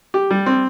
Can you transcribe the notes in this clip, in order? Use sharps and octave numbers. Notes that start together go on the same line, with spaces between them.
G4
G3
C4